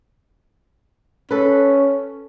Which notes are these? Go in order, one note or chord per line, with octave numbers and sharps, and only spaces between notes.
C#4 A4 B4